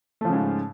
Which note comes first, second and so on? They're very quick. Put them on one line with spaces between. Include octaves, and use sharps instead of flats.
A3 F3 C#3 G#2